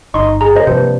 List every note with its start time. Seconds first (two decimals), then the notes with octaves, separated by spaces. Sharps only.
0.14 G1 D#4 C6 C#6
0.41 G#4 A#5
0.56 F#2 C5 D#5
0.67 G2 C3 F3 A#3 C5